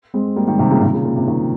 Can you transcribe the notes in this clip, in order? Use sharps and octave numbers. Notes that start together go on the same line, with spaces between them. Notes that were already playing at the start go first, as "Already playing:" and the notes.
G#3 C4
G3 A#3
D#3 G3
C3 D#3
A#2 C#3
C3 D#3
A#2 C#3
A#2
C3
C3 D#3